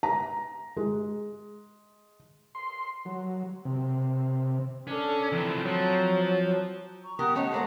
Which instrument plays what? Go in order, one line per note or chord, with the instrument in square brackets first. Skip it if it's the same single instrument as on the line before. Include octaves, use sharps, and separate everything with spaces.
[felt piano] A#5
G#3
[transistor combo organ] C6
F#3
C3
[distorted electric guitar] C#4 [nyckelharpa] D4 A4
[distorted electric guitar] E3 F3 [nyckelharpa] C4 A#5
[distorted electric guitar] F3 [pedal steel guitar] F#3
[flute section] A#5 C#6
[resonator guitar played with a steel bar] B3 G4 A#4 [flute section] F#5 D#6 F#6
[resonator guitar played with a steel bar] A3 C#4 C#5 [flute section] D#5 F#5
[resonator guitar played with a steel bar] G#3 A#3 B3 [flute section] A4 C5 A5